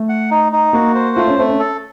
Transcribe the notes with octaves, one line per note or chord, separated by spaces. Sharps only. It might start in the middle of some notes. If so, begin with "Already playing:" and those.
Already playing: A3
F#5
D#4
D#4
A#3 F#4
C5
A3 F4
C#4
A3 C4
C#4
A4